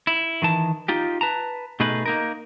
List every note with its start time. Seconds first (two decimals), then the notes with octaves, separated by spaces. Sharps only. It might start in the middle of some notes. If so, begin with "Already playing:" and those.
0.07 E4
0.42 D#3 E3 A5
0.88 D#4 F4 G4
1.21 B4 A5 A#5
1.80 B2 A3 D#4 G#4 B4
2.06 A#3 D#4 A#4